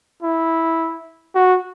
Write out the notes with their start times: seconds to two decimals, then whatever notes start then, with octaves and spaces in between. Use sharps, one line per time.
0.22 E4
1.35 F#4